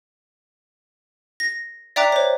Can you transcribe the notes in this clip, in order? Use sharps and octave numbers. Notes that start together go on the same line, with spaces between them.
A#6
D5 E5 G5 A#5 D6 F#6
C5 C#5